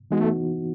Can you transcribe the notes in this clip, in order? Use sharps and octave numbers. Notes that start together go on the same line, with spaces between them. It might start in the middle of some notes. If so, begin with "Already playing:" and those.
E3 G#3 B3 D#4 F#4
A3